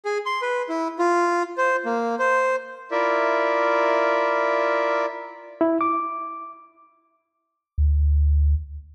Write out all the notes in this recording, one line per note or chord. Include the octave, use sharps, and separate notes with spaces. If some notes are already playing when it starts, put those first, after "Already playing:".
G#4
C6
B4
E4
F4
C5
A#3
C5
E4 F4 A#4 D5 E5
E4
D6
D2